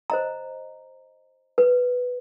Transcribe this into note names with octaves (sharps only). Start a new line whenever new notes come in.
C5 D#5 A#5
B4